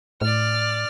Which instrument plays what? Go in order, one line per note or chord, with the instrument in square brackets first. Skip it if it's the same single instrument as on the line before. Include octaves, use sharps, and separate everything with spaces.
[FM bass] A2 [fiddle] D5 F6